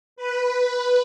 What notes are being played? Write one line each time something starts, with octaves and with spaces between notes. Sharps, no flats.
B4